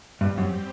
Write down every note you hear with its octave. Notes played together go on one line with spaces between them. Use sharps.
G2 G3 C4 G4
F#2